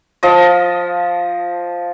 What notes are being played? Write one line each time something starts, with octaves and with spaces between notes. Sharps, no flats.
F3 D#5